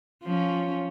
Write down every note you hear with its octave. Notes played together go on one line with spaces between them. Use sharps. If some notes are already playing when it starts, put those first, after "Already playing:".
F3 C#4